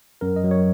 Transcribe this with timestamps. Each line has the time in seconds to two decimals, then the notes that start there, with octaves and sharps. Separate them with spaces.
0.21 F#2 A#4
0.36 D#5
0.44 F#3
0.51 C#5